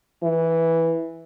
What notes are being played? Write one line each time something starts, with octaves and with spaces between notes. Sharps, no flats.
E3